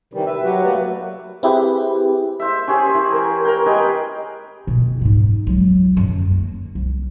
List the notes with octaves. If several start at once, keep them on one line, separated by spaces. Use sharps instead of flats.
C3 D#3 E3 G3
B4 E5
F#3 F#4 G4 B4
F#3 A3 A#3 F#4 B4 D5
C4 E4 G4 G#4 B4
C5 E5
C#4 G4 G#4 C5
E3
A#4
A#4 G5
G4 G#4 B4 D#5
B2 E3
G#2 D#4
C#2 F#3
F#2 D3
A#3
C2